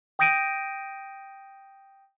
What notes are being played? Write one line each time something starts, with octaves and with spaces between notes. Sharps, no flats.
G5 D#6 G6 A#6 D7 D#7